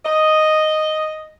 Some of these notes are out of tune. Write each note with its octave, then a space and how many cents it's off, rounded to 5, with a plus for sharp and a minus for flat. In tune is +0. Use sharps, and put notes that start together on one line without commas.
D#5 +0